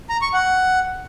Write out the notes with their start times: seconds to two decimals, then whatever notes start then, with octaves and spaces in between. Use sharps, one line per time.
0.10 A#5
0.22 C#6
0.33 F#5